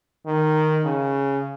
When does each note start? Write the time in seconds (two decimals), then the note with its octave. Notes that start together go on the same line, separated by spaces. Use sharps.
0.26 D#3
0.85 C#3